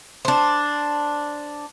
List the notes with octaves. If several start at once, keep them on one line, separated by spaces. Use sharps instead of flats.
D4 C5